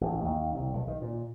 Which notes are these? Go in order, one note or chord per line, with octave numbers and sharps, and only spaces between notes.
A1
D#2
C2
B1
D#3
A#2